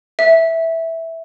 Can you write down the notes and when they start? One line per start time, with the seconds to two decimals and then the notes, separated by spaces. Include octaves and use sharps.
0.19 E5